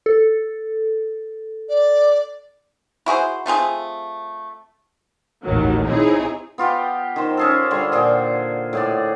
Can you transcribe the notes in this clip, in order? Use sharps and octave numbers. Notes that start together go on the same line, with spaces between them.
A4
D5
E4 F#4 G#4 C5
A3 C4 F4 G#4
A1 D#2 D#3 F#3
C4 D#4 E4 G#4 C#5
B3 F4 G4 G5
D#3 C5
C#4 G#4 A4
D3 G3 C5
A#2 G#4 F#5 G5
A2 G#4 D5